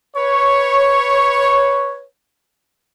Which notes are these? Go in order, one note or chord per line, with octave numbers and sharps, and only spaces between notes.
B4 C#5